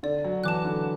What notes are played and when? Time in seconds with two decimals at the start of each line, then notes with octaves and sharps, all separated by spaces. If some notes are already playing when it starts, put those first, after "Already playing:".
0.03 D3 D5
0.24 F#3
0.44 E3 A5 D6 F#6
0.65 D3